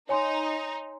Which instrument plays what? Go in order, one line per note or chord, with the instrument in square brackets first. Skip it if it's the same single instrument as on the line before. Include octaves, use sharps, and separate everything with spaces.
[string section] D#4 [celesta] C#5 G#5 C6